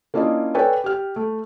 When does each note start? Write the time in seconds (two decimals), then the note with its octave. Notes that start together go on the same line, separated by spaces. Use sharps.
0.14 A#3 C#4 D4 E4 F4 D#5
0.55 A4 B4 C#5 D5 G5 G#5
0.84 G4 F6
1.16 A3